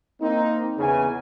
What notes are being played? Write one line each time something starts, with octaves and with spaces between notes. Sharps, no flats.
A#3 C4 D#4
E2 C#3 B3 G#5